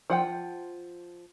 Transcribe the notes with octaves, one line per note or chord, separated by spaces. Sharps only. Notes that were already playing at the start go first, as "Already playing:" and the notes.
F3 F#5 G5